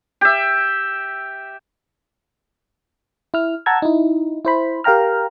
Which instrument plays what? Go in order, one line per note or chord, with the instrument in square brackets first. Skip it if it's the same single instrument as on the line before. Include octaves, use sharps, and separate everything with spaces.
[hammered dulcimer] G4 E5
[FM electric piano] E4 F6
F#5 A5 A#5 E6 G#6
D#4 E4
E4 C5 B5
G4 A#4 F5 G5 A#5 F6